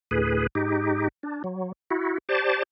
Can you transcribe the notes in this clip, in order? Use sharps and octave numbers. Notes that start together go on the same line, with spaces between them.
D2 A2 G#4 B4
G#2 D#4 G4
D4
F#3
E4 F#4
G4 C5 D5 A5